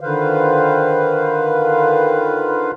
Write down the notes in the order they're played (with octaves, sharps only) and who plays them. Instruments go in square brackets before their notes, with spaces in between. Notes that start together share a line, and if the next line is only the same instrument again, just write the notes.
[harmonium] D3 D#3 F4 B4 C5 F5